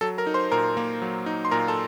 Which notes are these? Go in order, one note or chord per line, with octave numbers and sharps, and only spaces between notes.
F#3 A4 A5
A#4 A#5
D#4
C5 C6
A#2 A#4 A#5
A#3
F#3
D#4
C6
A#2 A#4 A#5
A4 A5